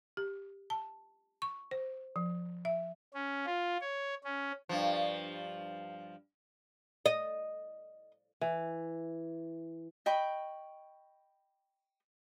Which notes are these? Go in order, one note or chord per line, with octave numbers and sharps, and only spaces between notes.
G4
A5
C#6
C5
F3
E5
C#4
F4
C#5
C#4
G2 F3
D#5
E3
D#5 G5 B5 C#6